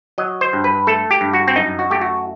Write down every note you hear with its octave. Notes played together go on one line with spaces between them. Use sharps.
F#3 D#5
C5
G2
B4
A3 A4
G4
G2
F#4
C4
F#2 D#4
F#4
A3 G4
F#4